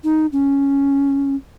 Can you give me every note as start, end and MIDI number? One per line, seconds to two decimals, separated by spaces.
0.04 0.26 63
0.32 1.35 61